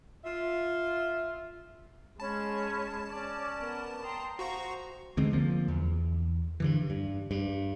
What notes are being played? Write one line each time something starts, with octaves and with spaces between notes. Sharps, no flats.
F4 E5
G#3 C#4 C#5 A5 B5
C#4 D5
B3 A#4
G5 A#5 C6 D#6
F#4 C5 F5 A#5 C#6
D2 D3 G#3 C4
D3 F3 A#3 C4
E2
G2 D3 E3
G2
G2